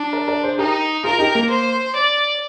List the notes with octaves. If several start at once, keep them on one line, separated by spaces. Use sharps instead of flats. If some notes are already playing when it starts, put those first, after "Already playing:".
Already playing: D4
A#4 D5
A#4 D5
G#4 C5
D#4 G4 A#4
F4 G#4 A#4
D#4 G4
A#3
C5
D5